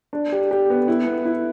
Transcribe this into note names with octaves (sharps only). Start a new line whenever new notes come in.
D4
G4
G4
B3
E4
B3
E4